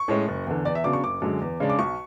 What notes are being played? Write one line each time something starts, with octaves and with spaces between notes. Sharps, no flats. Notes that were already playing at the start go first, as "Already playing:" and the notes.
Already playing: C#6
A2 G#3 C#4
F#1
E2 D3
E2 D5
E5
C#3 F#3 B3 D4 D6
C#6
F#1 D6
F#2 D3 G#3
E2
C#3 G#3 D4
D6
B1 C#6